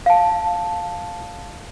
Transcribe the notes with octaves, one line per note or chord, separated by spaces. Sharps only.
F5 A5